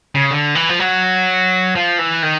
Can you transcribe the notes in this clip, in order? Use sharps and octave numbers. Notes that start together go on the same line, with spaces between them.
C#3
D3
E3
F3
F#3
F3
E3
D#3